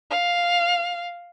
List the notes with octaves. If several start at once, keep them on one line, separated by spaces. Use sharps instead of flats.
F5